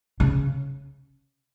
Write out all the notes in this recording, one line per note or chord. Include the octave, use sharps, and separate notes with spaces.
C#3